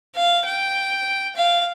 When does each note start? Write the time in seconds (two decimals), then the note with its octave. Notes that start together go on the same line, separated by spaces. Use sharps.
0.15 F5
0.45 G5
1.36 F5